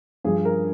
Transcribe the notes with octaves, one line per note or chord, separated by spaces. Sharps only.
G2 F3 G#4
A#4